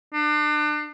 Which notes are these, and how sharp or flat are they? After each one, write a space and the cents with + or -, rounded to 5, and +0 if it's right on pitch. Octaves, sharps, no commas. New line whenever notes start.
D4 +35